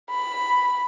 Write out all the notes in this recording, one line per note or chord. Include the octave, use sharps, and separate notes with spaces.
B5